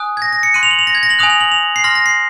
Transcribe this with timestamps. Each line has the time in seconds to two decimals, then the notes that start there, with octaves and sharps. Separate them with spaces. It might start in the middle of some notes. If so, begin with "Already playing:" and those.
Already playing: G#5 D#6 F#6
0.17 G#6
0.22 A#6
0.33 A#6
0.43 C#7
0.54 C6 F#6 D#7
0.63 F7
0.71 F#7
0.79 F7
0.87 A#6
0.95 G#6
1.03 A#6
1.10 F#7
1.19 G#5 D#6 F#6 F7
1.30 F7
1.41 F#7
1.52 F7
1.76 C7
1.84 C6 F6 A#6
1.95 A#6
2.06 C7